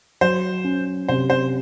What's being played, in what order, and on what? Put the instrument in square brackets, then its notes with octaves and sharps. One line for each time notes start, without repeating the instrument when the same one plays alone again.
[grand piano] F#3 [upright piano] C5
[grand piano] C#4
[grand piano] C3 [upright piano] C5
[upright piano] C5